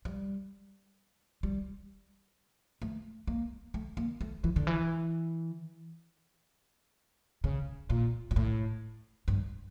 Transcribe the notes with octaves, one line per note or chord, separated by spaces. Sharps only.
G3
G3
A3
A#3
A3
A#3
A3
E3
D3
E3
C#3
A#2
A#2
A2
G2